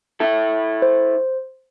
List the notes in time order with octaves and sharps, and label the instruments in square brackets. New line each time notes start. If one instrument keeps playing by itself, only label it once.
[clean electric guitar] E4 A4
[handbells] C5